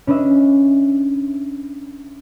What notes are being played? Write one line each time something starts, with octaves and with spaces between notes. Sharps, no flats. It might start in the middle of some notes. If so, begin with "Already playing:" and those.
C#4 D4 B4 D#5 E5